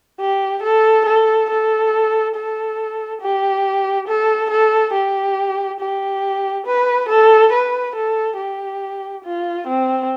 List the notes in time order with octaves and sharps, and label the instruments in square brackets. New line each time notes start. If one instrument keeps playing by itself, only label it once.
[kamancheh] G4
A4
A4
A4
A4
G4
A4
A4
G4
G4
B4
A4
B4
A4
G4
F4
C4